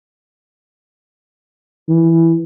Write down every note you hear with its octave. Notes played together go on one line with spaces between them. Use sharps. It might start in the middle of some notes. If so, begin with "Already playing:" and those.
E3